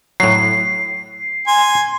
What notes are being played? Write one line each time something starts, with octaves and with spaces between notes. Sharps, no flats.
A2 F#3 C7
G#5 C6